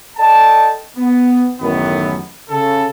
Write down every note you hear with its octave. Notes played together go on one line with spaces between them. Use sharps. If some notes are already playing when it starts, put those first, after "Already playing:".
A4 D5 D#5 G5 A5
B3
A1 F#2 D#3 B3
C#3 A4